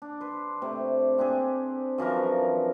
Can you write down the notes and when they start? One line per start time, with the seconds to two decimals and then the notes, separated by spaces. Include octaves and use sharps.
0.02 D4
0.20 B4 C6
0.62 C3 A3
1.18 C4 D4 G4 G#4
1.98 F#2 E3 F3 A#4